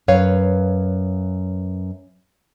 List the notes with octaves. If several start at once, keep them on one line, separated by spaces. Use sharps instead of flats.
F#2 B4 C#5 F5